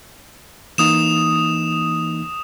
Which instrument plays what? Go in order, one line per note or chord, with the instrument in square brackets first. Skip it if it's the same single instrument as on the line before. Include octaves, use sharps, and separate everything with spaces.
[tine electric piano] E3 A#3 D#4 [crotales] D#6 E7